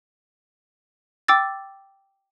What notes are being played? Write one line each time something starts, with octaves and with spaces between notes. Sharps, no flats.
G5 D6 E6 A6